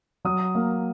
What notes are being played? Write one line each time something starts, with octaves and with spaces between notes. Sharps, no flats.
F#3 D#6
A#3